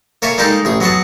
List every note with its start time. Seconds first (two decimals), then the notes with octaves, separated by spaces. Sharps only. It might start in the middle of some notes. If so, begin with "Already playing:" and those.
0.22 A#3 A4 C#5 E5 G#5
0.38 G3 G#3 A#3 D#4 G4 A4
0.65 A1 G#4
0.80 F#3 B3 G#4 F#5 A5